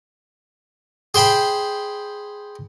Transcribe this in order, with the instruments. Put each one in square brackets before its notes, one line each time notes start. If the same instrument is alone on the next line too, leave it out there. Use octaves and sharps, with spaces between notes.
[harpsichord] G#4 C5 G5 B5